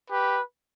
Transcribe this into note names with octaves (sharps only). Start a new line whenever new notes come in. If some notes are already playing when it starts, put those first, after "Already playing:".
G4 B4